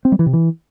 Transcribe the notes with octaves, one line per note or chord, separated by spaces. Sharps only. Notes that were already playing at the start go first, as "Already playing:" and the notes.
C4
G3
E3
C3
E3